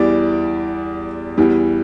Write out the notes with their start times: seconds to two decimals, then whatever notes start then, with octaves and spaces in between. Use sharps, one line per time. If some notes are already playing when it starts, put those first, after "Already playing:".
Already playing: E2 E3 G3 D5
1.37 E2 E3 G3